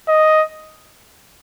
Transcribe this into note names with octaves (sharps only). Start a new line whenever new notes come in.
D#5